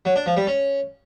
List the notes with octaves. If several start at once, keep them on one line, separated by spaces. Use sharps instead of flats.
F#3
D4
F3
G3
C#4